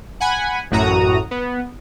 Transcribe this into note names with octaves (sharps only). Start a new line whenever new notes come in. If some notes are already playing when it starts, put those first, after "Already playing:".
F#5 G#5 B5
A1 F#2 A2 F#4 A#5 D#6
B3